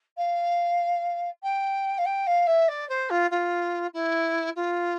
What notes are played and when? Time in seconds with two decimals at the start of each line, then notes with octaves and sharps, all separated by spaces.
0.17 F5
1.43 G5
1.98 F5
2.05 G5
2.27 F5
2.47 E5
2.68 D5
2.89 C5
3.10 F4
3.31 F4
3.94 E4
4.56 F4